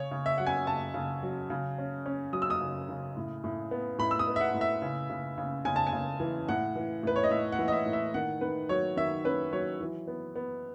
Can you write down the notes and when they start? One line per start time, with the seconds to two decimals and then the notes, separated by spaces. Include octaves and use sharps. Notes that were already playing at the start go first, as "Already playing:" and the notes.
Already playing: C#3 C#5
0.11 C#3
0.26 E5
0.38 F#3 F#5
0.47 G#5
0.67 C#3 A5
0.94 C#3
1.23 F#3
1.50 C#3
1.78 C#4
2.06 C#4
2.33 F#3 D#6
2.42 E6
2.50 D#6
2.60 C#3
2.89 C#3
3.17 A2
3.44 A2
3.71 B3
3.98 A2 B5
4.11 E6
4.19 D#6
4.27 B3
4.36 E5
4.41 F#5
4.54 A2
4.61 E5
4.82 C#3
5.10 C#3
5.38 C#3
5.65 C#3 G#5
5.76 A5
5.87 G#5
5.93 C#3
6.20 E3
6.49 A2 F#5
6.75 E3
7.03 A2 B4
7.16 C#5
7.24 D#5
7.30 A2 E5
7.52 F#5
7.59 E3
7.68 D#5
7.72 E5
7.86 A2
7.93 E5
8.14 D#3 F#5
8.41 D#3 B4
8.69 F#3 C#5
8.97 D#3 E5
9.25 C#4 B4
9.53 F#3 C#5
9.81 E3
10.07 B3
10.36 B3